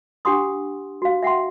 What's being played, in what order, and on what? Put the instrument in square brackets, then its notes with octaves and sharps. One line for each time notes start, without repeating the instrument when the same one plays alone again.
[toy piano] D4 G4 F#5 C6 D#6
F#4 F5
E5 F#5 G5 C6